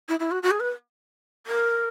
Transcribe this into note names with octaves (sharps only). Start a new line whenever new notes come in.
E4
E4
F#4
F#4
G#4
B4
A#4